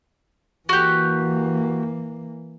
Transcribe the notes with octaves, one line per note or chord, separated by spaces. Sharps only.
E3 A#3 F#4 G4